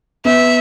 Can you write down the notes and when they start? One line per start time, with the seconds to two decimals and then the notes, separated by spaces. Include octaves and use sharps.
0.25 B3 E5